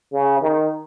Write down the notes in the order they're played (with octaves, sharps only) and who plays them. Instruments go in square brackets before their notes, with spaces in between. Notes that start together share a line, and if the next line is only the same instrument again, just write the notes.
[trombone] C#3
D#3